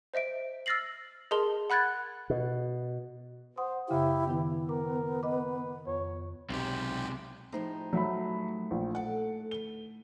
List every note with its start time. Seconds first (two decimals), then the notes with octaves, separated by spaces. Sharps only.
0.14 C5 D#5 E5 D7
0.66 E6 F6 A6 A#6 C7 F#7
1.31 G#4 A#4 D#5 A5 C6 G7
1.70 F#5 B5 F#6 G#6 A6
2.30 B2
3.58 C5 F#5 C6 D#6
3.89 F#2 C#3 E4 G4 F5
4.29 D#3 B3 E4 B4
4.69 A#4 D6
5.23 B4 D#5 D6
5.87 F2 C#5
6.50 B1 C3 G#3 G4
7.52 A2 F3 D#4 G4 G#4 C5
7.93 F#3 A3 E5 B5
8.71 A#1
8.95 A4 D5 F#5
9.51 D2 B4 G7